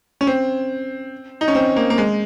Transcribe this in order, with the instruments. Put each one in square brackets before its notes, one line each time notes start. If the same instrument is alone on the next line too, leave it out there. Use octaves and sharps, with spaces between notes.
[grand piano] C#4
C4
D#4
C#4
C4
A#3
A#3
G#3